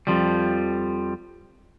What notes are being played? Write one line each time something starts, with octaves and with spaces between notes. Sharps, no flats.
F2 F3 G3